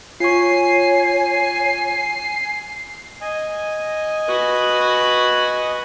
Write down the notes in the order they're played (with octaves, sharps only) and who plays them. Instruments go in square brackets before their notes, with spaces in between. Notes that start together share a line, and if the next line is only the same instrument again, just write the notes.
[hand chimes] F4 C#6 [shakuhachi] C#5 [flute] G#5 [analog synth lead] C7
[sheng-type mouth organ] D#5 G#5
[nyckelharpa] F#4 B4